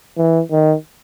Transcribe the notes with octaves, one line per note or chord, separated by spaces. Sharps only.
E3
D#3